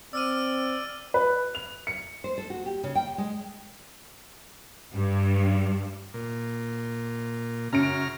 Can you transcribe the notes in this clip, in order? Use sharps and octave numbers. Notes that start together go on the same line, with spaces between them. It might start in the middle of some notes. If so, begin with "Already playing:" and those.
C4 D5 E6 F6 D#7
B4
F7
C#7
C5
A4
F#4
G4
C#3
G5
G#3
G2
A#2
F#2 C#3 A#5 F6 D7